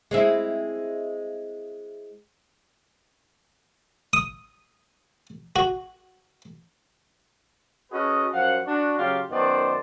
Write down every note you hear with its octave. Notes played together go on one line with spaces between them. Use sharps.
G#3 C4 E4
D#6
F#4
C#4 F#4 G#4 A4 B4 D#5
F#2 F3 F5 F#5
D4 F#4
C#3 F#3 F4 G4 F5
F#2 D#3 B3 C5 D5 A5